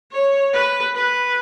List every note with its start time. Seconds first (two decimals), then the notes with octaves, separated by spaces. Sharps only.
0.12 C#5
0.54 B4
0.96 B4